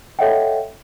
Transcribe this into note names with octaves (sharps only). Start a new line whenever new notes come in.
A4 C#5 D#5 E5 F#5 G5